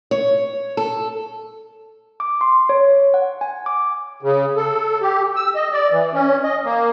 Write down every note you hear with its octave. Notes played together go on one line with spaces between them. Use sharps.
C#5
A4
D6
C6
C#5
F#5
G#5
D6
C#3
A4
G4
E6
D#5
D5
E3
C#4
D#5
A#3